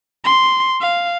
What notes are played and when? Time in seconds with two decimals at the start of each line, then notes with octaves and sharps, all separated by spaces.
0.24 C6
0.81 F5